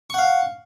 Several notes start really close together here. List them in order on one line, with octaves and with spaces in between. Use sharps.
C#6 F#5 F5